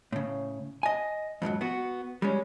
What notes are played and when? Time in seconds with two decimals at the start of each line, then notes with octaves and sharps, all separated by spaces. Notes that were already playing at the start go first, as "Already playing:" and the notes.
0.12 A2 C#3
0.83 D#5 G#5
1.42 F2 G#2 D#3 F#3
1.61 B3 F#4
2.22 G3 G#3 C#4